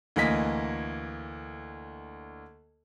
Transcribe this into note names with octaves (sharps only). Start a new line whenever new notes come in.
D2 E3 A#3 D#5 B6